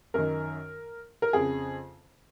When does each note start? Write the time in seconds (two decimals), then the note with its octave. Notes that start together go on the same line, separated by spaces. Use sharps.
0.14 F#2 D#3 A#4
1.22 A#4
1.33 F2 C#3 G#4